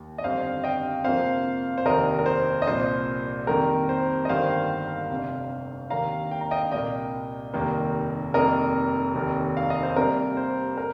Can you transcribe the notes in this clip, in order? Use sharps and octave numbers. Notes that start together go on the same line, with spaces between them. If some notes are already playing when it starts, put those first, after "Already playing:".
Already playing: D#2
D#5
G1 F2 D#3 G3 C5 F5
D#5 G5
F2 C3 F3 A#3 C5 F5
C5
F1 D#2 D#3 A#4 D#5
A#4
C5
D#5
C2 A#2 F3 C5
F2 D#3 G3 A#3 A#4
C5
D#5
G1 G2 D#3 G3 A#3 C5 F5
F1 F2 C3
D#2 D#3 A#3 F5 A#5
G5
A#5
D#5 G5
C2 A#2 A#3 D#5 G5
F1 D#2 D#3 G3 A#3
F1 F2 D#3 G3 A#3 A#4 D#5
F1 D#2 D#3
F5
D#5
C5
F2 C3 G3 A#3 A#4
C5
A#4